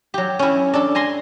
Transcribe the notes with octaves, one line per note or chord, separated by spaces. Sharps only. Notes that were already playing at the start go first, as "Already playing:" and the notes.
F#3 G4
C#4 E4
D4 A4
G#5 A#5 C6